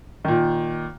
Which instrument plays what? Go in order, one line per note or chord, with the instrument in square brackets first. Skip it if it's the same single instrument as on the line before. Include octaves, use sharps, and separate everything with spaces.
[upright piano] A#2 D#3